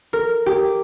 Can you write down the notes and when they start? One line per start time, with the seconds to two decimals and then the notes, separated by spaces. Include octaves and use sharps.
0.13 A#4
0.46 G4